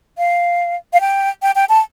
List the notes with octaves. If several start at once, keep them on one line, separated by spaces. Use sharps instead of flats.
F5
F5
G5
G5
G5
A5